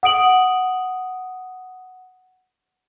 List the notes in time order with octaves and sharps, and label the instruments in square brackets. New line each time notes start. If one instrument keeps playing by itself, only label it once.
[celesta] F#5 D#6 D7 F#7